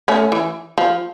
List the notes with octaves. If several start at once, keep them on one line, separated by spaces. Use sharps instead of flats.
A3 C#4
E3
F3